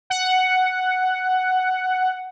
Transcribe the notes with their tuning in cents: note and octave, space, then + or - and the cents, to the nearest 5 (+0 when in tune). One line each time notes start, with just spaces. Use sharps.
F#5 +5